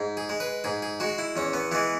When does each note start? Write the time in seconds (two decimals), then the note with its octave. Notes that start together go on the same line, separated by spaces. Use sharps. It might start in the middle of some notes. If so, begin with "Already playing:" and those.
Already playing: G#2
0.17 G#4
0.29 G#3
0.40 B4
0.64 G#2 G#4
0.82 G#4
1.00 G#3 F#4
1.18 E4
1.36 E2 C#4
1.53 B3
1.71 E3 G#3 B3